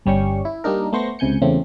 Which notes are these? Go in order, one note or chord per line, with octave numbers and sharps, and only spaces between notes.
G1 G3 C#4 G4 C#6
E4
G3 A#3 D4 D#4 A#4
A3 B3 C5 C6 C#6 A#6
C#2 C3 G#5 G6 C#7
E2 C#3 A3 C4